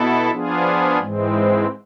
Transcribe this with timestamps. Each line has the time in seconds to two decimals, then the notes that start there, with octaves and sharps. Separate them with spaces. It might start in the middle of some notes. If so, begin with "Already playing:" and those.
Already playing: B2 B3 E4 A4
0.31 F3 B3 D4 F4 G#4
0.99 G#2 E3 G#3 C4